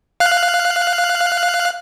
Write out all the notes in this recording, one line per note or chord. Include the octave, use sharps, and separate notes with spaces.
F5 F#6